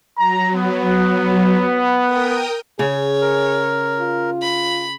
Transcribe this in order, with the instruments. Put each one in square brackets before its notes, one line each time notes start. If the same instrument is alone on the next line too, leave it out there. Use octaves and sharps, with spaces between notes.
[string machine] F#3 [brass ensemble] A#5
[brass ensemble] B3
[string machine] A#4 G5 D#6
[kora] C#3 [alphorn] G#4 [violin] C#5
[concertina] A#4
[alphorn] F4
[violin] B5